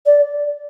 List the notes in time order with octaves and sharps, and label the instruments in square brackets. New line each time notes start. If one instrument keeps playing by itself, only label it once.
[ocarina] D5